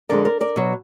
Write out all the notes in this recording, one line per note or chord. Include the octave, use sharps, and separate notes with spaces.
F2 D3 G#3 A#4 D5
A#4 D5
A#4 D5
B2 F#3